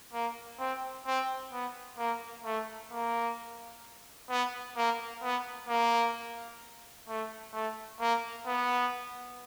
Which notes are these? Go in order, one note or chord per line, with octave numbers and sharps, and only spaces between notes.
A#3
C4
C4
B3
A#3
A3
A#3
B3
A#3
B3
A#3
A3
A3
A#3
B3